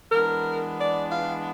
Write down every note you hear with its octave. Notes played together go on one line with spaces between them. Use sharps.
E3 G#3 B3 D4 A#4
D5
F5